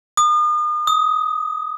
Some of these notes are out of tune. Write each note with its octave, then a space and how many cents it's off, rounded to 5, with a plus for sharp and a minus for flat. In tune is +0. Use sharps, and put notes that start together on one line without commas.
D#6 -40
D#6 +20